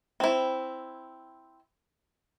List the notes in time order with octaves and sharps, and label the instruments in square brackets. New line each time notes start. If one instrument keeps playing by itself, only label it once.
[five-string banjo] C4 E4